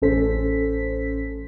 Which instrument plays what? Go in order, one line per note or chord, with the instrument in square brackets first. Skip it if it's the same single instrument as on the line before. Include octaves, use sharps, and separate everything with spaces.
[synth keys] A1 C#4 A4 C5 B6